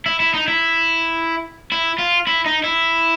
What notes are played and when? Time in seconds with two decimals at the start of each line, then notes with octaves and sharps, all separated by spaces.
0.06 E4
0.20 E4
0.34 D#4
0.48 E4
1.72 E4
1.99 F4
2.27 E4
2.46 D#4
2.64 E4